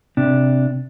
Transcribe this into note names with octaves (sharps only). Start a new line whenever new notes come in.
C3 D4